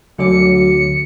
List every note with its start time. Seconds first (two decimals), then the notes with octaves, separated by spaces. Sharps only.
0.18 D2 D3 F#3 D6 C#7